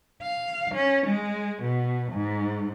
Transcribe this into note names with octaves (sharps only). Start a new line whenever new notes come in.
F5
C#4
G#3
B2
G#2